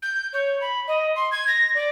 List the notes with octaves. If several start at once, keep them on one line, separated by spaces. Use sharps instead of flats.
G6
C#5
B5
D#5
C6
G#6
A#6
D5